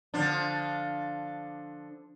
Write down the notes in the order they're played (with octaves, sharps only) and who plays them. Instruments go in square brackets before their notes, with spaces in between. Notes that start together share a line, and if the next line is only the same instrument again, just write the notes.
[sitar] D3 F3 D4